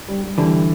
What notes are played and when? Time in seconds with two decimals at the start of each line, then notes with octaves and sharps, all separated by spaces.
0.08 G3
0.23 G3
0.38 D3 E3 G3